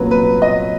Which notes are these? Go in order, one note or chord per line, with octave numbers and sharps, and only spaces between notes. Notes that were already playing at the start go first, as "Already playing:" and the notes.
Already playing: C2 A#2 F#3 A#3 C#4 B4
B4
D#5